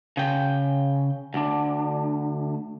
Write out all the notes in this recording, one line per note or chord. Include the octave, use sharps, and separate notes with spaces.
C#3 G5
D2 D4